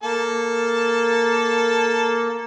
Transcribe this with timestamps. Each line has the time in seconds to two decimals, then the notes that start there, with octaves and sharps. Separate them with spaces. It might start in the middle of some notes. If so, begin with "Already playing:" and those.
0.03 A#3 A4 A5